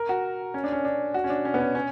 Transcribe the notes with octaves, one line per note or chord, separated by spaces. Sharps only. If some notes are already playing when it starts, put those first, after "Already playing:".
Already playing: A#4
F#4
C#4
D4
C#4
D4
F#4
C#4
D4
C#4
B3
C#4
C#4